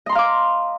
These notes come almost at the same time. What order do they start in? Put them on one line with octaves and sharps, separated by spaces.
D#5 C6 A#5 F5 D6